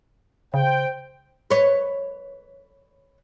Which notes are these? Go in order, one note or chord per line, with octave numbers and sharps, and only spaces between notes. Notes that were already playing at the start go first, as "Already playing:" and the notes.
C#3 C5 G5
B4 C#5